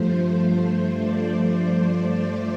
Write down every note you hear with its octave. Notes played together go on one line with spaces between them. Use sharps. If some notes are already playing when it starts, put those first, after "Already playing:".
Already playing: G2 F3 A3 C5
D5